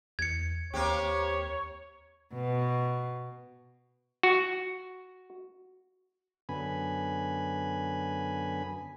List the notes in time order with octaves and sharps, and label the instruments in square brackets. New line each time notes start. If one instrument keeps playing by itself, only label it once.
[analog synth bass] E2 [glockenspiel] G#6 C#7
[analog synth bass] D#2 [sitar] A#3 C4 G4 [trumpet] C#5
[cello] B2
[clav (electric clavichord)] F#4
[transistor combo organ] F#2 D3 B3 G#5 B5